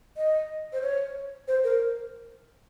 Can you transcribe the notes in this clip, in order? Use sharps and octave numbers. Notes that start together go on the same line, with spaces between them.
D#5
C5
C#5
C5
A#4